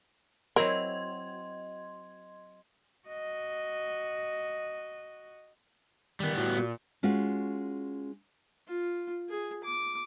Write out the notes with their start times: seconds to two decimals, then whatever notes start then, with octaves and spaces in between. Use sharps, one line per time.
0.56 F#3 C4 E4 A#4 D#5 C6 G#6
3.08 F#4 D#5
6.20 D#3 G3 B3
6.37 A2 F#4
6.58 A#2
7.03 G#3 C#4 F4 F#4
8.67 F4
9.29 G#4
9.64 D6